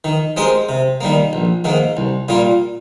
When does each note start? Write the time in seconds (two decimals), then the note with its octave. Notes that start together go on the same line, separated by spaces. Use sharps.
0.04 D#3
0.37 G#3 C4 G4 A#4
0.69 C3
1.01 D#3 G3 A#3
1.33 A#1
1.64 G#2 D#3 A#3
1.97 C2
2.28 A#2 G3 A#3 F4